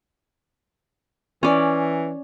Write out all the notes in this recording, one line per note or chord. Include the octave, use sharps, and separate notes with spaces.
E3 C#4 D5